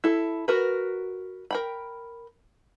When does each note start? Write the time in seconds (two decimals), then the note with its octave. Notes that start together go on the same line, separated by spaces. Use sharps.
0.04 E4 A4
0.48 F#4 A#4 B4
1.51 A#4 G5 B5